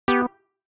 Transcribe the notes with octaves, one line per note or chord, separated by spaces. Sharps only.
B3 G4